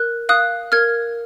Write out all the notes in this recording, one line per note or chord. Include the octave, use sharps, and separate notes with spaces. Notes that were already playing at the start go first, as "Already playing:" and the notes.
Already playing: A#4 F#6
F5 D#6 F#6
A#4 F6 G#6